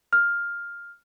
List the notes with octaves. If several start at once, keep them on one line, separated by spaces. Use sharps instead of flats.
F6